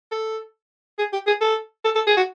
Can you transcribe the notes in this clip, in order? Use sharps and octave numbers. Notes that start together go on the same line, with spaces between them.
A4
G#4
G4
G#4
A4
A4
A4
G#4
F#4